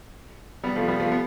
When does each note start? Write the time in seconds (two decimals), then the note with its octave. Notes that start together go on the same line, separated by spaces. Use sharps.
0.64 G3 B3
0.76 F3 A3
0.88 G3 B3
1.00 F3 A3
1.12 B3